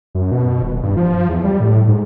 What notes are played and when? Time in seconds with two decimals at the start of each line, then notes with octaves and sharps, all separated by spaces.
0.15 F#2
0.32 B2
0.62 D#1
0.83 G2
0.97 F3
1.29 E2
1.44 G3
1.60 A2
1.88 G#2